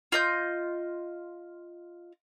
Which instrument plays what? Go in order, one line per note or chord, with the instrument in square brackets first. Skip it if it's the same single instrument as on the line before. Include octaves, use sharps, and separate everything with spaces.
[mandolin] F4 D#5 G6